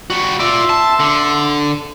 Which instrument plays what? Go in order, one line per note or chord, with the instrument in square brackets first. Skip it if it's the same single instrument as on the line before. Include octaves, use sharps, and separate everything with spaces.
[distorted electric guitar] G3 F#4
[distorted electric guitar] F4 D5 [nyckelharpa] E5 C6
[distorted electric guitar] A5
D3